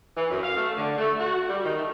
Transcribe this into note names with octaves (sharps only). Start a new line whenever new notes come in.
E3
F#2
F5
A3
D3
A3
F#4
G3
D#3
A3